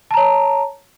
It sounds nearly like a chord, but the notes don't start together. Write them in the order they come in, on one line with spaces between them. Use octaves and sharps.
A5 A#5 C#5